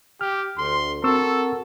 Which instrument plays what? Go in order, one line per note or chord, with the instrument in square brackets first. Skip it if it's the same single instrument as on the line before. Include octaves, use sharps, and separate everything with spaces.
[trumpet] G4 [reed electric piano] F6
[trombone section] D2 [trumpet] C6
[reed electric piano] C4 C#6 E6 [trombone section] F#4 A#4 [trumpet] A4